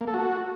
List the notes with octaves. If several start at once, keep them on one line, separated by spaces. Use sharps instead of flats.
A#3
A4
F#4